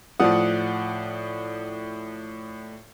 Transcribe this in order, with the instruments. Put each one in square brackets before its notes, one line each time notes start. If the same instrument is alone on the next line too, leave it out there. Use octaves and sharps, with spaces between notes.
[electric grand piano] A2 D5 D#6 [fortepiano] F3 F#5